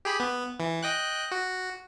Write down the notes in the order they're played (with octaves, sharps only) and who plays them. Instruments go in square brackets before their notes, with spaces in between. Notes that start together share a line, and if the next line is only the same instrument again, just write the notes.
[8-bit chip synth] G4 G#4 B5
B3
E3
D#5 G5 F#6
F#4